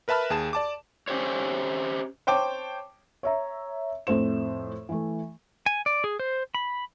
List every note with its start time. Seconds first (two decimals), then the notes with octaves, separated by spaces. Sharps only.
0.08 A#4 B4 E5 A5 B5 F6
0.30 D#2 G#4 A5 E7
0.53 D5 A5 D6
1.08 C#4 G4 C5 C#5
2.27 C5 C#5 G5 A5 D6
3.23 C#5 E5 A#5
4.07 F2 A2 A3 C5 E7
4.89 E3 A3
5.66 G#5
5.86 D5
6.04 G#4
6.19 C5
6.55 B5